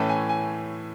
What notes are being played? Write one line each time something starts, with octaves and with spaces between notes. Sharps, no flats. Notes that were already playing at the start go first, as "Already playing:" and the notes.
Already playing: A2 E3 A3 C#4 A5
G#5
G#5